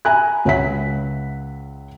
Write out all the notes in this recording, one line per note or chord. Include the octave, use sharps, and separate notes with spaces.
E5 G#5 A#5 B5 F#6
C#2 C#5 E5 F#5 B6